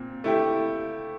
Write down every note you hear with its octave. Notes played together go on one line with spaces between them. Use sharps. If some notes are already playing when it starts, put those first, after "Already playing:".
Already playing: A#2 C4
A3 E4 G4